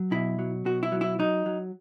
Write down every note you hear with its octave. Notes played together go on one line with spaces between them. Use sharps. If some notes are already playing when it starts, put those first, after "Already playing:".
Already playing: F#3
B2 E4
F#3
B2 F#4
E4
F#3
E4
F#3 D#4
F#3